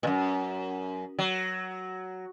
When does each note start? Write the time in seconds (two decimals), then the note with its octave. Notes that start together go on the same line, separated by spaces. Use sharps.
0.03 F#2 A#2
1.19 F#3